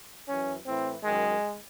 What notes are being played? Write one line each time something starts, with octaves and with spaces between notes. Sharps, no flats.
F#2 E3 C#4
A2 E3 C4
F#2 D#3 G#3